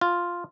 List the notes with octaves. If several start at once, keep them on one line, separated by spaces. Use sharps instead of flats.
F4